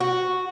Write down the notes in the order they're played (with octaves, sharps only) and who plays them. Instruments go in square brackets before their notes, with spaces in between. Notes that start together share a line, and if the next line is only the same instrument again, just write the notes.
[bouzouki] F#4